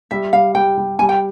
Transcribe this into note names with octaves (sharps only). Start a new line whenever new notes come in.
G3 E5
G3 F5
G3 G5
G3
G3 G#5
G5